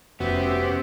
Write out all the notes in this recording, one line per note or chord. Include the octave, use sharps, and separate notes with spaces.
F1 B3 C#4 F#4 G4 C5 E5